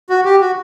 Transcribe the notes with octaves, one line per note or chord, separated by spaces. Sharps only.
F#4
G4
F#4